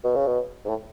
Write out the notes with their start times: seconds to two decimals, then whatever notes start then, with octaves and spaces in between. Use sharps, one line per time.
0.04 B2
0.16 C#3
0.27 B2
0.65 G#2
0.69 A2